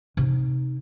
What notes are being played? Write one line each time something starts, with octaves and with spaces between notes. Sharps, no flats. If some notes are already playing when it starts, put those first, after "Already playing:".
C3 D#4